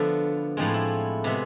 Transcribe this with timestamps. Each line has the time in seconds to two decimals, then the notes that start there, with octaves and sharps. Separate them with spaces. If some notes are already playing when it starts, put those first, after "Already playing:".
Already playing: D3 F3 A3 B3 D4 A4
0.57 A2 F3 G#3 C4
0.74 E4
1.24 C3 G#3 B3